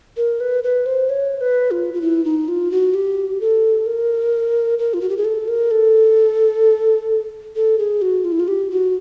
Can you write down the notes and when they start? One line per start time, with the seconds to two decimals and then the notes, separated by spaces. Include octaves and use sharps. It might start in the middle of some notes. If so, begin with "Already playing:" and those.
0.17 A#4
0.40 B4
0.64 B4
0.86 C5
1.09 C#5
1.41 B4
1.71 F4
1.94 F4
2.02 E4
2.25 D#4
2.48 F4
2.71 F#4
2.94 G4
3.41 A4
3.86 A#4
4.79 A#4
4.94 F4
5.01 F#4
5.09 G4
5.17 G#4
5.25 A4
5.48 A#4
5.71 A4
7.56 A4
7.78 G#4
8.02 F#4
8.25 F4
8.32 E4
8.40 F4
8.48 G4
8.71 F#4